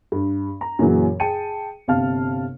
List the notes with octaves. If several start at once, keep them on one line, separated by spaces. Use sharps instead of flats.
G2
A#5
F#2 A#2 C#3 E3 F#3
G#4 G5 A5 C#7 D#7
G1 C3 F5 A5 F6